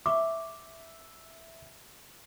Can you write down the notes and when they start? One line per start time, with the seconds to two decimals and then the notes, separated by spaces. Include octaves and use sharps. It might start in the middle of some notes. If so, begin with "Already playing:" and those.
0.06 E5 C#6 D6